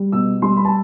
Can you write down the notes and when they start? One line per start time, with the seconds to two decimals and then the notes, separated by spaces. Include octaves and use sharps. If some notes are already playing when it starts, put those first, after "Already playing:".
Already playing: G3
0.12 B2 E6
0.42 G3 C6
0.57 B5
0.65 A5